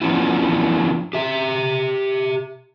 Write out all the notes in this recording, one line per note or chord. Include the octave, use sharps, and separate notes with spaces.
F3 B3 C#4 D4 E4 F4
G4 E5